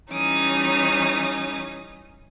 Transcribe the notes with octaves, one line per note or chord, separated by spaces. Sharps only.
E3 G3 C#4 D#4 D#6